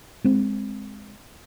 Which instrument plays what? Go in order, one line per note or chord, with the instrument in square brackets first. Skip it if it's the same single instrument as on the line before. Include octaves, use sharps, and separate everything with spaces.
[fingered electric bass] G#3 C4